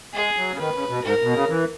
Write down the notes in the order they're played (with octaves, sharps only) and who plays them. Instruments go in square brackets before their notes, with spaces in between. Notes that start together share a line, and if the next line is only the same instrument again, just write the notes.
[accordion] G#3 [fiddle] G#4
[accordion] F#3
C#3
[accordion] D#3 [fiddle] B4
[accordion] C#3
B2
[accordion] G#2 [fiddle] A#4
[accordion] B2
C#3
E3